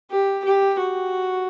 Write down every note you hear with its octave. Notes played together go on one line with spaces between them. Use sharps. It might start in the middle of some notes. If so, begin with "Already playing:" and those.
G4
G4
F#4